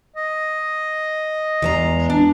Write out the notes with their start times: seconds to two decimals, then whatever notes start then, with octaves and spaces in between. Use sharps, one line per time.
0.17 D#5
1.62 E2 G#3 A#5
2.10 D4